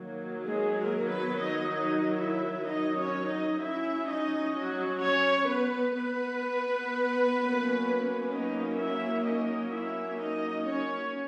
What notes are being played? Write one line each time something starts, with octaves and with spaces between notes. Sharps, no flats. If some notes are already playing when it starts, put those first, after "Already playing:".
Already playing: D#3 F#3 A#3
G#3 G#4
A#3 A#4
B3 B4
D#4 D#5
D#4 D#5
E4 E5
D#4 D#5
C#4 C#5
D#4 D#5
F#3 C#4 E4 E5
D#4 D#5
F#3 F#4
C#4 C#5
B3 B4
B3 B4
F#3 A#3 C#4
D#4 D#5
E4 E5
D#4 D#5
E4 E5
D#4 D#5
C#4 C#5